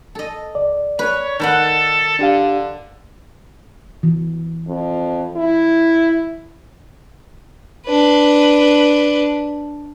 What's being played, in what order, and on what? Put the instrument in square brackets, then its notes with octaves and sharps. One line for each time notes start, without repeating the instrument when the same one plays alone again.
[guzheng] A4 D#5
[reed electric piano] C#2 D5
[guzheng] B4 [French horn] C#5
[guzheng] D#3 B4 F#5 [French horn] A4
[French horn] D3 [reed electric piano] D4 G4 F5
[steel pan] E3
[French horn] F2
E4
[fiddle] D4 B4